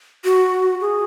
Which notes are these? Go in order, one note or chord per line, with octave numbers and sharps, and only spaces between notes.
F#4
G#4